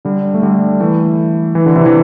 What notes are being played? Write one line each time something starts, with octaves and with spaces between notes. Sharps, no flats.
D3 G3
A3
D3 G3
E3 A3
E3
D3
C3 E3
E3